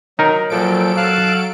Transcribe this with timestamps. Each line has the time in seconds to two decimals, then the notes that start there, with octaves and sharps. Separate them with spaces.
0.19 F#3 D#4 A#4
0.50 A#2 F3 F#3 A4 D7
0.97 F5 A5 F#6